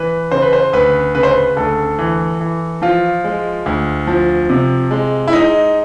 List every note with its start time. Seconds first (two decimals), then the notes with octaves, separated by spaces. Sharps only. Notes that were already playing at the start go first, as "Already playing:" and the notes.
Already playing: E3 B4
0.31 C#3 C5
0.42 B4
0.53 C5
0.73 D2 B4
1.15 C#3 B4
1.23 C5
1.32 B4
1.57 D2 A4
1.99 E3
2.40 E3
2.82 F3 F4
3.24 G#3
3.66 D2
4.07 F3
4.50 C3
4.91 G#3
5.28 E4
5.33 G#3 D#4